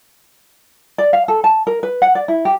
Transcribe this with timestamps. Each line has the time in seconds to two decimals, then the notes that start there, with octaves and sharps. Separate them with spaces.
0.98 D5
1.13 F5
1.28 A4
1.44 A5
1.67 A#4
1.83 B4
2.02 F#5
2.15 D5
2.28 E4
2.45 G4